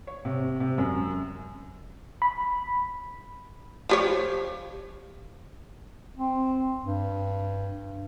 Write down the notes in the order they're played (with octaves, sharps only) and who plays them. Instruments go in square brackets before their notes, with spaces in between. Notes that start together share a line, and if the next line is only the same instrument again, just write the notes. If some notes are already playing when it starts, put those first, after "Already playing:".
[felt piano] C#5
C3
C3
F#2
[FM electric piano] B5
[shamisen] F3 G4 C#5
[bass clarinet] C4
G2